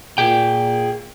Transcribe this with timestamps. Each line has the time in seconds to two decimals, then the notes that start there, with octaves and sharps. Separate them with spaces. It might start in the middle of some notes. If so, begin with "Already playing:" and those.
0.18 A#2 G#4 G5